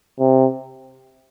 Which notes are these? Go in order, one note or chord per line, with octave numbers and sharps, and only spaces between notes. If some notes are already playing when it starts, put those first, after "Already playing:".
C3